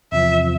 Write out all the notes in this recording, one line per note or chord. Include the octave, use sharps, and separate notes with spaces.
E2 C3 F3 E5